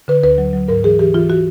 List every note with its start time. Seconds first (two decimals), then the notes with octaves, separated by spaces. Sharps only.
0.08 D3 B4
0.23 D2 B4
0.38 F#3
0.53 F#3
0.68 G#2 A#4
0.84 E3 G#4
0.99 E3 G4
1.14 E3 F4
1.29 E3 F#4